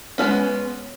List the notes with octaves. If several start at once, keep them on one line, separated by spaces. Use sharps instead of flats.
G#3 A3 B3 C#4